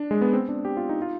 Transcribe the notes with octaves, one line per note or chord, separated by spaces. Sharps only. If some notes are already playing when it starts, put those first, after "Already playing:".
Already playing: D4
G#3
B3
C4
D4
G4
F4
D#4
F4